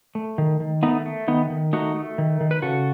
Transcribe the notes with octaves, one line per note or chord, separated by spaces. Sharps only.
A3
D#3
D#3
A3 B3 D#4
A3
D#3 B3 D#4
D#3
A3 D#4 F#4
A3
D#3
D#3
B4
C#3 F#4 A4